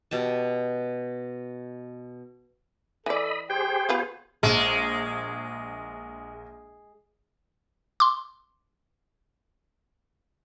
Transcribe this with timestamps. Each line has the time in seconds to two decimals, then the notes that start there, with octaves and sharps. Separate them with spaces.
0.11 B2 G4 A5
3.06 E3 A4 D5 D#5 B5
3.50 G4 G#4 C5 G5
3.89 B3 F4 B4
4.43 A#1 G#3
8.00 C6 D6